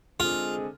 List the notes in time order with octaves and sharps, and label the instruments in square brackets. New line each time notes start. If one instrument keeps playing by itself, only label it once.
[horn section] D3 G#3 C4 G#4 [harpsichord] F4